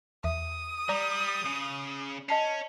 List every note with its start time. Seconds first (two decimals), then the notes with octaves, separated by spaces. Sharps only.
0.24 E2 E5 D#6
0.89 G3 D5 A#5
1.46 C#3
2.29 C#4 D#5 A5 C7